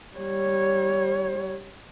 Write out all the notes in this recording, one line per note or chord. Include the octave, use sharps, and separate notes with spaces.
G3 C#5